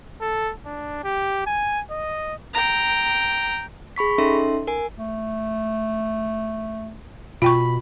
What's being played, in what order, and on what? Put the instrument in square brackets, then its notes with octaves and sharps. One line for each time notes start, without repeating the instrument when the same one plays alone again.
[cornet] A4
D4
G4
G#5
D#5
[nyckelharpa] G5 A#5
[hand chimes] G#4 B5 C#6 B6
C#4 D#4 A4 E5 C6
A#4 G#5
[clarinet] A3
[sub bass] B2 [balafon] F4 G5 C#6 [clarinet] B5